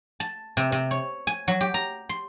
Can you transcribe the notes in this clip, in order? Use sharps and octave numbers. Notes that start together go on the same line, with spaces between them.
A5
C3
C3
C#5
G#5
F#3
G4
A#5
C6